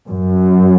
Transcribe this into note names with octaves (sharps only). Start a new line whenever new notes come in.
F#2